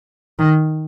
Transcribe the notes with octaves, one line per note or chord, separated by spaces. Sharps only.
D#3